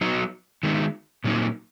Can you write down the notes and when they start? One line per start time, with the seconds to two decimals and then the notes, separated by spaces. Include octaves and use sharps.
0.01 F#3 B3 D#4
0.63 D#3 G#3 B3 D#4
1.24 A#2 F#3 A#3 D#4